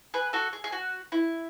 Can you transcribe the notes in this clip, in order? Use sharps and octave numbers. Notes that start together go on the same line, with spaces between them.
G#4 B4
F#4 A4
G#4
G#4
F#4
E4